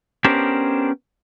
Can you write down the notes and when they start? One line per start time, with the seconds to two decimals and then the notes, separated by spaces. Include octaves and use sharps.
0.24 B3 C#4 D4 G4 A#4 C5